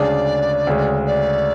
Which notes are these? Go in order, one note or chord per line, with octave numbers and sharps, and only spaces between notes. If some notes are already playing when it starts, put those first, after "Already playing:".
Already playing: D2 C#3 G#3 D4 G#4 D5
D2 C#3 G#3
D5